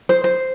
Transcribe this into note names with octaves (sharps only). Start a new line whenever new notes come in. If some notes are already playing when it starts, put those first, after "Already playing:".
C5
C5